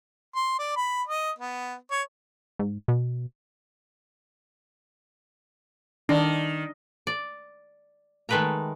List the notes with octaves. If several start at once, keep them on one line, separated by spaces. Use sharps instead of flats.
C6
D5
B5
D#5
B3
C#5
G#2
B2
D#3 D4
D5
D#3 G#3 A3 B4 G5 A#5